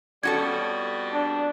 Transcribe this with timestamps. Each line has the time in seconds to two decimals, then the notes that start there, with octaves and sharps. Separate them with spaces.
0.23 F2 B2 G3 C#4 F#4 A4 G#6
1.13 D4